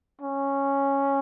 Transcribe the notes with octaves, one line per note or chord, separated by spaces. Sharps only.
C#4